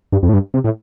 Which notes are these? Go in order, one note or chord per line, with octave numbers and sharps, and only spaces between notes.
G2
F2
A2
G2
C3
A2